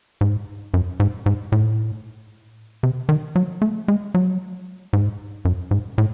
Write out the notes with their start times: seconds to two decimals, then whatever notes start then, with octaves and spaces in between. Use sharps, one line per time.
0.21 G#2
0.74 F#2
1.00 G#2
1.26 G#2
1.52 A2
2.83 C3
3.09 D#3
3.36 F#3
3.62 A3
3.88 G#3
4.14 F#3
4.93 G#2
5.45 F#2
5.71 G#2
5.98 A2